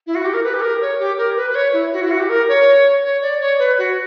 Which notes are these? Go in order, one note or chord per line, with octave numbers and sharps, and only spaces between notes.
E4
F#4
G4
A#4
B4
G4
A#4
C#5
G4
A#4
B4
B4
C#5
E4
F#4
E4
F#4
G4
A#4
C#5
C#5
D5
C#5
B4
F#4